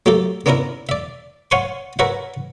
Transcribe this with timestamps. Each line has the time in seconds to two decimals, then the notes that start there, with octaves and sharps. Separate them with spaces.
0.06 F#3 A3 A#3 G4 A4
0.46 A#3 B3 C#4 D4 E4 A#4
0.89 D5 E5
1.51 C#5 F5 F#5 G#5 C6 C#6
1.99 A#4 B4 C#5 E5 F#5